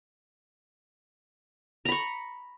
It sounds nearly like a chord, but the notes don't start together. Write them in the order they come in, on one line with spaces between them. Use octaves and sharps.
A#5 B5 C#6